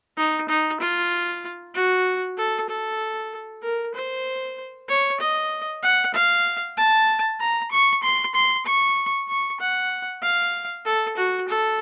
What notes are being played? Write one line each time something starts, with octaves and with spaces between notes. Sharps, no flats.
D#4
D#4
F4
F#4
A4
A4
A#4
C5
C#5
D#5
F#5
F5
A5
A#5
C#6
C6
C6
C#6
C#6
F#5
F5
A4
F#4
A4